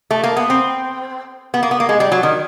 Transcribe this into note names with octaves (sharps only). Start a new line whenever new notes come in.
A3
A#3
B3
C4
B3
A#3
B3
A#3
G#3
G3
F#3
D#3